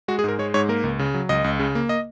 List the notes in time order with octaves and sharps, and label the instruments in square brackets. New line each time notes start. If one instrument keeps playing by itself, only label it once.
[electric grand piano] G#3 F#4
G#4
G#2 A#4
G#3 C#5
G#2 C#5
A#3 A#4
C#2
C#3
F#3
C#2 D#5
C#2
C#3
A#3
D#5